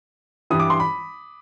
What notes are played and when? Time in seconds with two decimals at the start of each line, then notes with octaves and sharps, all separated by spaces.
0.50 G2 E3 G3 D#6
0.60 D6
0.70 C6
0.80 B5